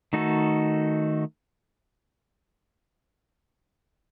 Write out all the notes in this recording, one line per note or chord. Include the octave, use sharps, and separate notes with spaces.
D#3 A3 D#4 F#4 A4